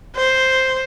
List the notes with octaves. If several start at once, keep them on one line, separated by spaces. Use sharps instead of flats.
C5